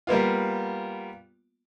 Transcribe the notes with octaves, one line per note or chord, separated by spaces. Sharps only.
G3 A#3 B3 F4